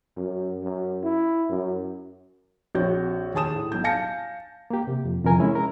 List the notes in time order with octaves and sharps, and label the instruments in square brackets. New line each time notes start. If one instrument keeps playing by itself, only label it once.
[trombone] F#2
F#2
E4
F#2
[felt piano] A#1 C4 F#4 C#5 G6
D#2 G#4 A5 D#6 E7
A2
B1 G6
F5 G#5 A5 G6 A#6 C#7
[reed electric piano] A#3 G4
C3
F2
F2 C3 E3 A#4 G#5
G#3 C#4 E4
A#4